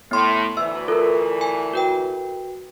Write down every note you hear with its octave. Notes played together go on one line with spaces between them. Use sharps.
A2 B3 C6
D2 E3 E5 E6
F4 A4 A#4
G#5
F#4 B4 G5